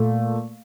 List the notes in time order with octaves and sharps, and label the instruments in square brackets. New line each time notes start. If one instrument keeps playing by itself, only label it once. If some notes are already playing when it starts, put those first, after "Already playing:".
Already playing: [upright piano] A#2 A3